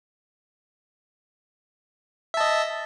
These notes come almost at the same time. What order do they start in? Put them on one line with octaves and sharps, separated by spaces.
E5 A5 D#5